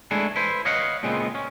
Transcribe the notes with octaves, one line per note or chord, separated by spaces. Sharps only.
G#3 A3 D4 E4 G#4
E4 B4 C5
C#5 D#5 F5 F#5
A#2 C#3 G#3 B3 C4
C#4